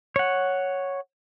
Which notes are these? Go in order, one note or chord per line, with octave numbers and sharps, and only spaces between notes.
C#5 F#5